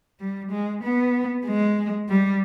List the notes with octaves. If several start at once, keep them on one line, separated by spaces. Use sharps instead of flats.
G3
G#3
B3
G#3
G3